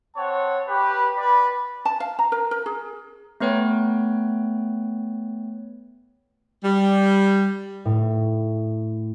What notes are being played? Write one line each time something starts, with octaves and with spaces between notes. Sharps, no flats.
C4 C#5 F#5 A5
G4 B4
B4 D5 B5
A5
F5
A#5
A#4
A#4
G#4
A3 B3 B4 C#5 G5
G3
A2